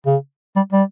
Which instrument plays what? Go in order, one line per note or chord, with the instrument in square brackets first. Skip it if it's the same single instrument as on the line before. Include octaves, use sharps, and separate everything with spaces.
[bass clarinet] C#3
G3
G3